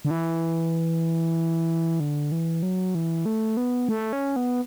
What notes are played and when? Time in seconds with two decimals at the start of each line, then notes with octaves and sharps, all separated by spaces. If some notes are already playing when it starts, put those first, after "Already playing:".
0.05 D3
0.11 E3
2.00 D3
2.32 E3
2.63 F#3
2.95 E3
3.26 A3
3.57 B3
3.89 A3
4.13 C#4
4.36 B3